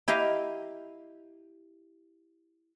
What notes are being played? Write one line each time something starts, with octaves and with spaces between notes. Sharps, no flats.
E4 G4 D#5 F5 A#5